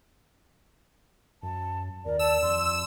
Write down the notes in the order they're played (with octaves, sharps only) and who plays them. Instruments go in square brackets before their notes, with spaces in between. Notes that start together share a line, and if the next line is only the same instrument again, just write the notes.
[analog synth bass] F#2 [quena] A5
[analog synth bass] D#2 [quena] A#4 [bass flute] D5
[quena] A5 [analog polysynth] E6 E7
[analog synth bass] F2 [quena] C6